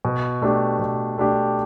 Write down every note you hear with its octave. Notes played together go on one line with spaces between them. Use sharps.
B2
A3 D4 G4
B2
A3 D4 G4